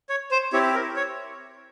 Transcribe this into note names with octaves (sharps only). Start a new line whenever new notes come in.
C#5
C5
C4 E4 G4 C#5
A#4
C#5